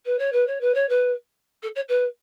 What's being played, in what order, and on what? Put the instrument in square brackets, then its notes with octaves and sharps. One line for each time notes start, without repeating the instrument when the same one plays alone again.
[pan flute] B4
C#5
B4
C#5
B4
C#5
B4
A4
C#5
B4